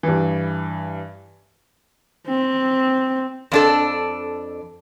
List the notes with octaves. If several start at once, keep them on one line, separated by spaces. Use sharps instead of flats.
G2 E3
C4
F2 D4 A4